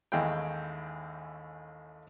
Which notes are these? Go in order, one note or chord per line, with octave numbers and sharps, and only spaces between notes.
A1 D#2 G#3 E4 G5